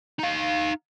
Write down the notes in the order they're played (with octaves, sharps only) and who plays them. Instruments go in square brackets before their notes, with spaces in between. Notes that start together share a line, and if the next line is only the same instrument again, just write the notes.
[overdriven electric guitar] D#4 F5